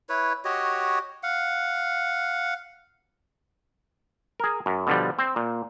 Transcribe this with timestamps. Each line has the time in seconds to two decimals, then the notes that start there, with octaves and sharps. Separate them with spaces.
0.09 E4 B4 C#5
0.45 F#4 G4 C#5 D#5
1.23 F5 F#5
4.40 G#4 A#4
4.66 F#2
4.87 B2 D3 F3 G3
5.19 C4
5.36 A#2